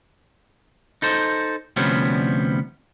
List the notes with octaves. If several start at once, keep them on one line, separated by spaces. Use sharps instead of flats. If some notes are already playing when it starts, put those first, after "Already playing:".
D#4 A4 C5
D2 C3 F3 G3 B3 C#4